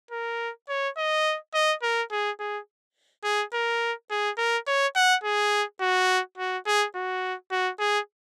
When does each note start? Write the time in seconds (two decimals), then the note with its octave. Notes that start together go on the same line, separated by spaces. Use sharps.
0.11 A#4
0.69 C#5
0.97 D#5
1.54 D#5
1.82 A#4
2.11 G#4
2.39 G#4
3.24 G#4
3.53 A#4
4.10 G#4
4.38 A#4
4.67 C#5
4.96 F#5
5.24 G#4
5.81 F#4
6.38 F#4
6.66 G#4
6.95 F#4
7.51 F#4
7.79 G#4